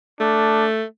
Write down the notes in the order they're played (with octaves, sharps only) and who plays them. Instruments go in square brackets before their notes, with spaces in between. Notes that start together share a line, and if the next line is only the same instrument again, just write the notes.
[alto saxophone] A3 [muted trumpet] D4